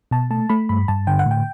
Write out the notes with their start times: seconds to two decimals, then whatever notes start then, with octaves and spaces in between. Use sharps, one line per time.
0.11 B2 A5
0.31 A3 A5
0.49 A3 B5
0.69 G2 B5
0.88 G2 A5
1.07 D3 G5
1.19 F#5
1.26 A2
1.31 G5